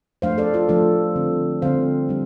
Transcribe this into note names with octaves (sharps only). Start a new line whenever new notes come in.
F3 A3 D4 C5 F5
A4 D5
F4 A4
F3 A3 D4 F4 A4
D3 G3 C4
D3 G3 C4 C5 F5
G3 D4